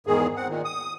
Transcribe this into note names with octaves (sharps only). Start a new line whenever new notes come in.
E2 G#2 D#3 G#4
C4 F#5
A#2 D#3
D#6